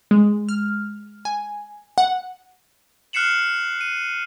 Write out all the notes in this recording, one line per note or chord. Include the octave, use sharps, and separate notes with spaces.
G#3
F6
G#5
F#5
F6 F#6 C7 C#7 E7 F#7
D#7